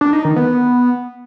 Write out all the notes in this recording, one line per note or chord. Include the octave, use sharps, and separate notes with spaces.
D4
D#4
D#3
B3